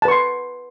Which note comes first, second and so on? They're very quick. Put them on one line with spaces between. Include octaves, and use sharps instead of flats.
A5 B4 C#6 C6